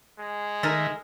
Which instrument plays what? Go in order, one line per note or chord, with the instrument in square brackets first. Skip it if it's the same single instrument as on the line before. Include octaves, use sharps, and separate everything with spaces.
[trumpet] G#3
[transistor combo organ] D#3 E5 [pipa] A3 D#4 A#4